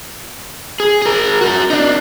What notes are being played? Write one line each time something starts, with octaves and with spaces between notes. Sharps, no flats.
G#4
G#4 A#4
F#4 A#4
D4 D#4